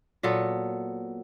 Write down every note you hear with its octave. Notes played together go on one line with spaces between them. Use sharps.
A#2 F#3 B3 A4